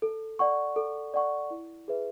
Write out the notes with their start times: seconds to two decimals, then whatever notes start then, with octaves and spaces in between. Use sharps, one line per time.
0.02 A4
0.39 D5 F#5 C#6
0.76 A4
1.14 D5 F#5 C#6
1.50 E4
1.88 G#4 B4 E5